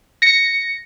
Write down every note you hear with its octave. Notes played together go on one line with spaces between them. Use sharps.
A#6 C#7